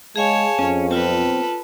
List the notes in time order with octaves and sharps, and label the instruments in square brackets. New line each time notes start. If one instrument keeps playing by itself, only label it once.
[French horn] G#3 [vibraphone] G#4 F5 G#5 [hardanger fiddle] C#5 A5
[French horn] F2 [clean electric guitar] C#4
[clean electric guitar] B1 C4 [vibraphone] F4 A5 [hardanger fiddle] A4 B4